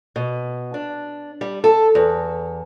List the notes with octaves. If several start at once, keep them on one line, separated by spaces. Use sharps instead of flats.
B2
D4
G3
A4
E2